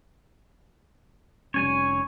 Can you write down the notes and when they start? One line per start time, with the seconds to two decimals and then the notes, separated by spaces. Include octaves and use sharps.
1.54 F1 G3 C#4 C#5 G#5